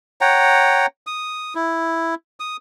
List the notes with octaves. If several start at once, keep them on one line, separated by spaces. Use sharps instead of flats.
C#5 F#5 G5 A#5
D#6
E4
D#6